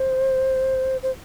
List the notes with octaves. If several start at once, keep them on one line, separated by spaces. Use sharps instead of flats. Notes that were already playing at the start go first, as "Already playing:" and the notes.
Already playing: C5
C5